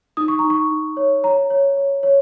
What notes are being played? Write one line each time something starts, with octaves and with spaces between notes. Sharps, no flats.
D#4 D#6
C#6
A#5
D#4
C#6
D#4
C#5
C#5 A#5
C#5
C#5
C#5